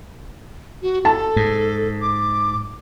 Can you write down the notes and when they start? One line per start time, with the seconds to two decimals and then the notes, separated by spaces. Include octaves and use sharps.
0.82 F#4
1.05 A4 A5
1.36 G#2
2.02 D6